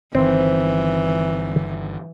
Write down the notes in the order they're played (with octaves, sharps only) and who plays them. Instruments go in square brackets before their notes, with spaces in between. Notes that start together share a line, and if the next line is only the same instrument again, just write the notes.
[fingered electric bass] G1 D#3 [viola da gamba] E3 [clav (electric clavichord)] C4